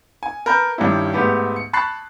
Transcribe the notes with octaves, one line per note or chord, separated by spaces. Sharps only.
G#5
A#4 B4 A5 B5 G6
G2 D#3 G3 C#4 E4
G#2 A3 B3 G4
C#7
A5 B5 C#6 F#6 A6 C7